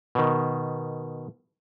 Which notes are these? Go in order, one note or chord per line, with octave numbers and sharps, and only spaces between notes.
B2 D#3